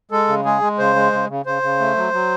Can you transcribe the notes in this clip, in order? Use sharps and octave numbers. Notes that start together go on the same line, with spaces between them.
G#3 A4
C#3
G#3 G#4
G#3
C#3 C5
G#3
C#3
C#3
C#3 C5
C#3
A3
F#3
F#3